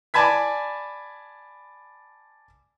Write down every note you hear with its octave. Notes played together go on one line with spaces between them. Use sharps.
D5 G#5 A5 B5 G#6 B6